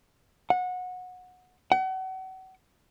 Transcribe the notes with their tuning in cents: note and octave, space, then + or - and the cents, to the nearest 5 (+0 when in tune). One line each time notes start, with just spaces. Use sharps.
F#5 -20
F#5 +35